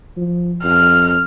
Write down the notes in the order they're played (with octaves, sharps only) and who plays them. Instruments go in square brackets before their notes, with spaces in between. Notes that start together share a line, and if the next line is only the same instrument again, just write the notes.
[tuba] F3
[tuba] F2 [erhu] F6